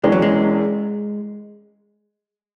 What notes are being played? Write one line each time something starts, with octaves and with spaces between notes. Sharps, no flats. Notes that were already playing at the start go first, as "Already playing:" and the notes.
E1 E2 E3 G#3 C#4
F#3
G#3